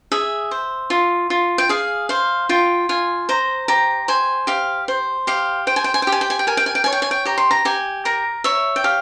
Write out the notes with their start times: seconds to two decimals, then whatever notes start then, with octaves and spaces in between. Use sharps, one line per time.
0.12 G#4 E5
0.51 C5
0.90 F4
1.30 F4
1.58 G5
1.69 G#4 F5
2.09 C5 F5
2.49 F4 G5
2.89 F4 G#5
3.29 C5 A#5
3.68 G4 A#5
4.08 C5 G#5
4.47 G4 F5
4.88 C5
5.27 G4 F5
5.67 C5 G5
5.76 G#5
5.84 G5
5.94 G#5
6.02 G5
6.07 G4
6.12 G#5
6.21 G5
6.30 G#5
6.39 G5
6.47 A#4 G#5
6.57 G5
6.66 G#5
6.75 G5
6.84 C#5 G#5
6.92 G5
7.02 G#5
7.11 G5
7.25 G4 A#5
7.38 C6
7.51 A#5
7.65 G4 G#5
8.05 A#4 A#5
8.44 C#5 E5
8.76 G5
8.84 G4 F5